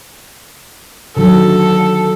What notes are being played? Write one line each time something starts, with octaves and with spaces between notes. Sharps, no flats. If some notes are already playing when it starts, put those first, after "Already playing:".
D3 D#3 F#3 A4